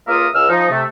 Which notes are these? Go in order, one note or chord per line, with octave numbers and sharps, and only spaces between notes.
C#2 A#3 F4 A#4 E5 D#6
C#2 E6 F6
F3 D#4
C3 A3